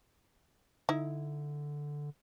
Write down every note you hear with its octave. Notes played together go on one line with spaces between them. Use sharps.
D3 D#4 E4